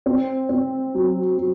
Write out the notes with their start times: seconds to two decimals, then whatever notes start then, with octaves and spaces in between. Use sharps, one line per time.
0.06 C4
0.49 C4
0.94 F#3
1.38 F#3